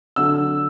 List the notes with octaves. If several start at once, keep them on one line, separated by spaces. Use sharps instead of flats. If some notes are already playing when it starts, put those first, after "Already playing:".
D3 F#3 E6